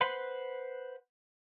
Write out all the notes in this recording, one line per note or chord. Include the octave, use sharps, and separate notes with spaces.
B4 C5 F#5 B5 C6